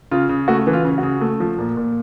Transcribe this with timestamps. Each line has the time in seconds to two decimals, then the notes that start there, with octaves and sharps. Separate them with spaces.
0.11 C#3 F4
0.29 C#3
0.48 A3 F#4
0.67 E3
0.73 F4
0.85 C#3
0.98 C#3 F#4
1.21 A3
1.40 F3
1.59 A#2
1.77 A#2